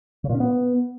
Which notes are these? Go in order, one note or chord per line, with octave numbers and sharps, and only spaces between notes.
C#3
A#2
C#4
B3